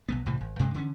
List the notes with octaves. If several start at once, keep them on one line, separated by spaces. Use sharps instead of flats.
B1 F#3 B3
C2 A2 C3 E3
G#1
G2 C3 F#3 G#3
D3 E3 G3 C#4